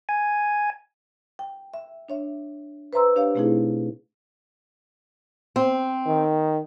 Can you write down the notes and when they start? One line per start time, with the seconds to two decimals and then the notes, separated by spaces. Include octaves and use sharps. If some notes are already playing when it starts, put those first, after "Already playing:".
0.09 G#5
1.39 G5
1.74 E5
2.09 D4 C#5 E5
2.93 B4 C5 E5 A#5 C6 E6
3.16 D4 G4 C#5 F5
3.35 B2 A3 C4 D#4 E4 G#4
5.56 C4
6.06 D#3